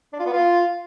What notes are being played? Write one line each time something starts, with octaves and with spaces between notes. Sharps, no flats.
D4
F4
B3
F4